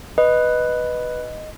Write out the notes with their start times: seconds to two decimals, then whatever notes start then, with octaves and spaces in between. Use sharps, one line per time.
0.18 B4 D#5